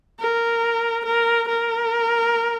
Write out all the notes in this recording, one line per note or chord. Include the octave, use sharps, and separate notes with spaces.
A#4
A#4
A#4